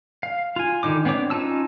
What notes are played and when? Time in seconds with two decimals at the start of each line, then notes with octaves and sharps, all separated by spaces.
0.23 F5
0.56 F4 G#5
0.83 D3 D#3 D#4 D6
1.05 B3 C4 D4 C#5 D6
1.30 C#4 D#4 F4 A5 E6